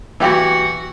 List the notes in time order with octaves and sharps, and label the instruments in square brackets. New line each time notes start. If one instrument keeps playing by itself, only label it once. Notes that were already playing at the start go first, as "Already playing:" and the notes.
[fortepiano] E3 G4 [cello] F#4